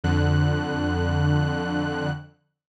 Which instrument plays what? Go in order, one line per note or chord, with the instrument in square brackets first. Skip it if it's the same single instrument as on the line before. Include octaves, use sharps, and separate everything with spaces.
[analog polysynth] F2 D3 F#6